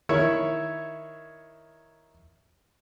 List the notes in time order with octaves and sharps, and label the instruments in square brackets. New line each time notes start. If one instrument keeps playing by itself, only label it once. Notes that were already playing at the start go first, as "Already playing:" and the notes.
[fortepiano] D#3 E4 C#5 E5